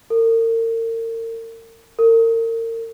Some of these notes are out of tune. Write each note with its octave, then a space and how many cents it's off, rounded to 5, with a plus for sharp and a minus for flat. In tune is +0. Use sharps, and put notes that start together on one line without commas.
A#4 -40
A#4 -35